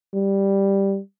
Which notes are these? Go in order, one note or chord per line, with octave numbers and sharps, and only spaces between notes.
G3